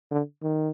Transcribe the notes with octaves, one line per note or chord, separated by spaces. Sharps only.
D3
D#3